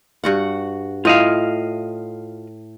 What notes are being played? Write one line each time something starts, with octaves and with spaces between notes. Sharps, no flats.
G2 F#4 F#5
A2 F4 D#5 F5